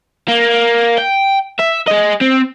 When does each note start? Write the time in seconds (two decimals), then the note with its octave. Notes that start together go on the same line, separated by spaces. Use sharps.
0.28 A#3
0.98 G5
1.59 E5
1.88 G#4 D#5
2.21 C4